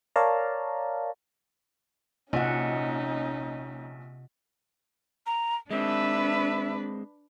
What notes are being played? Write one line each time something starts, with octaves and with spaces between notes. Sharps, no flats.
A#4 C#5 D5 F5 A5 A#5
A#1 C3 C#4 D#4 D#5 F#5
A#5
G#3 C4 D4 B4 E5